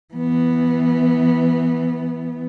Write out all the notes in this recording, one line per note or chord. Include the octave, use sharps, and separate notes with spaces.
E3 B3